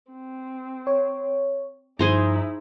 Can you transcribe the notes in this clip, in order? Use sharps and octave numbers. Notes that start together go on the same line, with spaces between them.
C4
C#5
G2 F3 D#4 E4 G#4 C5 A#5